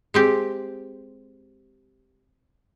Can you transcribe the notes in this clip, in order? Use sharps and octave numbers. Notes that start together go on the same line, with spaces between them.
G#3 C4 G4